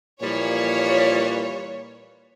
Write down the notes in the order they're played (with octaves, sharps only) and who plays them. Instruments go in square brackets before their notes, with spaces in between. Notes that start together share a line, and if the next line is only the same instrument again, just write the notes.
[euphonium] A#2 [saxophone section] E3 F3 G3 [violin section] C#5